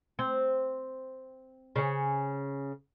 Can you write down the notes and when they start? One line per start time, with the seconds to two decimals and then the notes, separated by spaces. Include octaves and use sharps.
0.19 C4
1.76 C#3 C#4